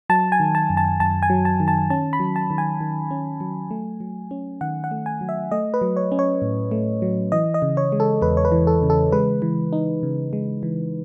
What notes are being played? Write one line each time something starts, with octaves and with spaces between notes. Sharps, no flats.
F#3 A5
G#5
D#3
A5
F#2
A5
F#2 A5
G#5
F#3
A5
D#3
A5
C#4 A5
B5
F#3
A5
D#3
G#5
D#3
C#4
F#3
A3
F#3
C#4
D#3 F#5
F#5
A3
G#5
F#3
E5
A3 D#5
B4
F#3
C#5
C#4
C#5
A2
A3
F#3
E3 D#5
D#5
C#3
C#5
G#3
A4
E2 B4
C#5
B4
E3
A4
C#3
A4
G#3 B4
E3
D#4
C#3
G#3
E3